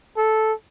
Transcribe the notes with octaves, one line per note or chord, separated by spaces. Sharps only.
A4